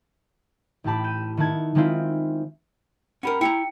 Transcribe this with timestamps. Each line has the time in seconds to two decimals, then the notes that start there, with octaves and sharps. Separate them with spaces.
0.84 A1 A2 E4 G4 A5 B5
1.04 G6 D#7 E7
1.37 D#3 B3 E4 A5 G#6
1.75 D#3 G#3 C4 E4 F4
3.23 C#4 G4 A#4 F#5 B5
3.41 E4 G4 G5 A#5 C#7